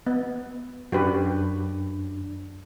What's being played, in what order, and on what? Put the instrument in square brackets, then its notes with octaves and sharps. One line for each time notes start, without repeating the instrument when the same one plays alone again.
[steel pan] B3
[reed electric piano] F#2 D4 [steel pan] F#4 G4 B4